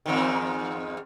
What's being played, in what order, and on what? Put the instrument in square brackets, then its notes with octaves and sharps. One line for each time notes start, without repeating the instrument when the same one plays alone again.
[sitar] E2 G#2 D#3